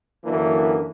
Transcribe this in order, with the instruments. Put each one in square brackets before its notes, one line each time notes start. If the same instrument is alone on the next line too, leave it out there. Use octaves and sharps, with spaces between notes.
[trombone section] F#2 D3 E3 A#3 D4